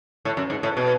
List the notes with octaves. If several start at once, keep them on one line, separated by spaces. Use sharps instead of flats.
A2
F#2
G#2
A2
B2